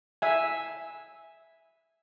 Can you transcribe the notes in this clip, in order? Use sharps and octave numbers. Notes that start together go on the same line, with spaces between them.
E5 G#5